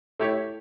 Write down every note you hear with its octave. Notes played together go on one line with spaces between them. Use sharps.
A3 E4 G4 C#5